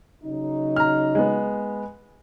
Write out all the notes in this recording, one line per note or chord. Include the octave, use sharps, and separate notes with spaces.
C#3 F#3 D#4
A#5 F6
G#3 B3